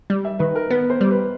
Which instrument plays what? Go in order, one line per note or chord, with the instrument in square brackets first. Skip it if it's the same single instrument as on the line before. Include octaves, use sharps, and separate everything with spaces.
[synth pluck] G3
[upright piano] E5
[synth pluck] D#3 [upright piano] B4
[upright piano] A#4
[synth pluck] B3 [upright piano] B4
[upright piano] C5
[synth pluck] G3
[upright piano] B4